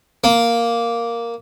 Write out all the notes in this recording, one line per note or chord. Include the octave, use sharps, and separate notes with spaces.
A#3